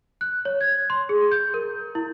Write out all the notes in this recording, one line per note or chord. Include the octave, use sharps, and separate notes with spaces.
F#6
C#5
G#6
C6
G#4
G6
A#4
E4